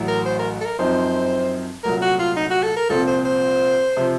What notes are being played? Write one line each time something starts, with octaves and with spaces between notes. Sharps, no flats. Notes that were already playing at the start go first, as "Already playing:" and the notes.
Already playing: A1 A2 F#3
A#4
C5
A#4
A4
A#4
F#2 F3 C4 D#4 C5
C2 A#2 F#3 A3 A#4
F#4
F4
D#4
F#4
A4
A#4
C2 A#2 F3 C4 F4 A4
C5
C5
C3 F3